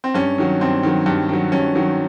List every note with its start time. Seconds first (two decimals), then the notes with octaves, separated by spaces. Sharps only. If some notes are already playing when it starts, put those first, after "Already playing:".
0.04 C4
0.15 G2 C#4
0.38 D#3 F#3
0.61 G2 C4
0.83 D#3 F#3
1.06 G2
1.29 D#3 F#3
1.52 G2 C#4
1.75 D#3 F#3